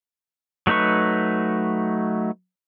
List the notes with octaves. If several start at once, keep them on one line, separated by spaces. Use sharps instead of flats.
F#3 A3 D#4 B4 C#6